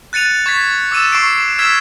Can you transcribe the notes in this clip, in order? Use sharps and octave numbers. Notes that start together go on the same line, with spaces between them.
F#6 A6 C#7 D#7 F7
C#6 G#6 A6 B6
D6 E6 A6 D#7 E7
C#6 C7 D7
E6 F6 G#6 B6 E7